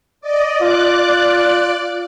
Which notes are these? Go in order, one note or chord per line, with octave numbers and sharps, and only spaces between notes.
D5 D#5
F4 D5 D6 F#6